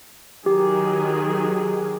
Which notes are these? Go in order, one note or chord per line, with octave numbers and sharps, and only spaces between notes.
D#3 F#3 G4 G#4